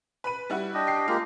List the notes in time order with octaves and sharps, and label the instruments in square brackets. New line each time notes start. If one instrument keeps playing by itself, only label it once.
[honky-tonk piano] B4 B5 D#7
G3 E4 F#4
[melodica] D4 G4 D#5
[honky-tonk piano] G5 C7
[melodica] G#3 A#3 G4 [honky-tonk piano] F4